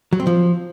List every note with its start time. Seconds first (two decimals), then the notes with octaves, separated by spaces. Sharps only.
0.13 F#3
0.20 C4
0.27 F3